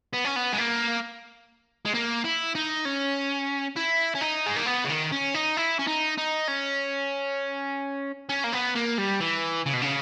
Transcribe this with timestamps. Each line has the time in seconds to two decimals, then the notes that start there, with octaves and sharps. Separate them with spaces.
0.13 B3
0.25 C#4
0.36 B3
0.53 G#3
0.58 A#3
1.85 G#3
1.94 A#3
2.25 E4
2.55 D#4
2.85 C#4
3.76 E4
4.15 C#4
4.21 D#4
4.46 G#3
4.57 A#3
4.66 B3
4.85 C#3
4.89 D#3
5.12 C#4
5.34 D#4
5.57 E4
5.79 C#4
5.88 D#4
6.18 D#4
6.48 C#4
8.29 C#4
8.44 A#3
8.53 B3
8.75 A#3
8.98 G3
9.20 E3
9.66 C#3
9.73 B2
9.82 C#3